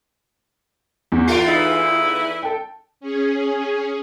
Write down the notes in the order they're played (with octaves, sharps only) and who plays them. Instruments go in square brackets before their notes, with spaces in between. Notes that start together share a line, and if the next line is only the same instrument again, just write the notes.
[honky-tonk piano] E2
[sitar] E2 A3 F4 [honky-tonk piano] C7 D7
[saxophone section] E3 E4 [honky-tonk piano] D#4
[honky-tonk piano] A4 G5
[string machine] C#4 G#4